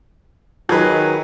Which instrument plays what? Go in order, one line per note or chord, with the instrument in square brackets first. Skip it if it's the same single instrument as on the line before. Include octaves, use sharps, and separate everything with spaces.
[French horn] D#3 [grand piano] F#3 G#4 B4